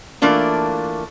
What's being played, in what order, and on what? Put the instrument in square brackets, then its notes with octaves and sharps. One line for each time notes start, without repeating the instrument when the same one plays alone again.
[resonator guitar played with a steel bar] E3 A3 A#3 D4 F4